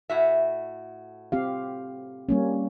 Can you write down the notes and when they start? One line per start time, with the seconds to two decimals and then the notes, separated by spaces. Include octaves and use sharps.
0.10 A2 F#4 E5
1.32 C4 G4 F5
2.29 G3 A#3 C#4